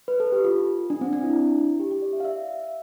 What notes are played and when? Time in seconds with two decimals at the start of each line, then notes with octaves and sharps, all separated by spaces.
0.08 B4
0.20 A4
0.32 G4
0.44 F4
0.90 D4
1.01 C4
1.13 D4
1.23 E4
1.80 G4
1.91 G4
2.02 D5
2.13 E5
2.20 F5
2.24 E5